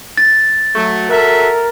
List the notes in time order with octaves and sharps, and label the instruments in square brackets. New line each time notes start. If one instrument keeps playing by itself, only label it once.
[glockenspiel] A6
[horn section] F#3 A3
[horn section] F#4 A4 E5 [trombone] A#4